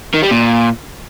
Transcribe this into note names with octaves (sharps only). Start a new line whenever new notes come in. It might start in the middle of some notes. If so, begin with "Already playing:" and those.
D#3
G3
A#2